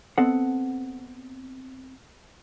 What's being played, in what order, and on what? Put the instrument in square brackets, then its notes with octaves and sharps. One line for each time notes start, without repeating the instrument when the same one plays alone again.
[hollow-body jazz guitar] B3 C4 A4 D#5 F#5